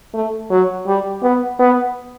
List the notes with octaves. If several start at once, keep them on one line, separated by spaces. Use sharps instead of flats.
A3
F#3
G3
B3
B3